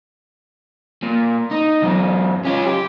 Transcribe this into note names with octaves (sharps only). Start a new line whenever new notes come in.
A#2
D#4
E2 F#3
C#4 F4
G4